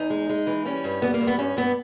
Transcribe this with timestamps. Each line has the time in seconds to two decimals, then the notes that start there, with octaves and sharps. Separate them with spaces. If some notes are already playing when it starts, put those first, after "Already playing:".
Already playing: E2 D#4
0.10 G#3
0.29 G#3
0.47 E3
0.65 G3 C#4
0.84 G2
1.02 G3 B3
1.14 A#3
1.21 G2
1.27 B3
1.38 G2 C#4
1.57 G2 B3